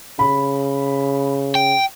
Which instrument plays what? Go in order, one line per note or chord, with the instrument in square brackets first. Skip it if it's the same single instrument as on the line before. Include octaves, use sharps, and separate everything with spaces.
[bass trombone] C#3 [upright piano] B5
[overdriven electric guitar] G5